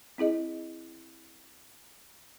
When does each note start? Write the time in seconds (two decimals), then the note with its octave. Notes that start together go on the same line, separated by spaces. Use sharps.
0.18 C4 E4 G#4 D#5